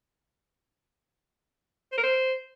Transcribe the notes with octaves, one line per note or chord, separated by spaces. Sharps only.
C5
A#4
C5